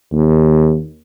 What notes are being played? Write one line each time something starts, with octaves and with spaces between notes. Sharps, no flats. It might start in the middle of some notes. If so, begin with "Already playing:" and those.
D#2